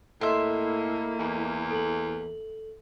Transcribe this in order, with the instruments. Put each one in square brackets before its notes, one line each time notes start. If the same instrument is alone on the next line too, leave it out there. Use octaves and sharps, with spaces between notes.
[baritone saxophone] A2 [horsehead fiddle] A#3 E4 [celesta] A4 D#5 [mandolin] E5 C6
[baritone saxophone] E2
[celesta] A4 F#7